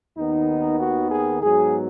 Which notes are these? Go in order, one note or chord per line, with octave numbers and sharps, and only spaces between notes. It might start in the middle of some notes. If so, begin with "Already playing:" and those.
D#2 D#3 B3 D#4
F#4
G#4
G#2 F#3 B3 G#4